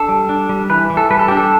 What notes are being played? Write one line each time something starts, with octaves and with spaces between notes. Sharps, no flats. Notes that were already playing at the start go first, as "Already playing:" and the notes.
Already playing: D4 A4
G3
D4
G3
E3 B4
E3
A4
G3 B4
A4
D4 G4
A4